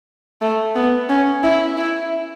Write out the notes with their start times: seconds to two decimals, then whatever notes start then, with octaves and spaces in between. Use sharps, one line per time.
0.41 A3
0.75 B3
1.09 C#4
1.43 E4
1.77 E4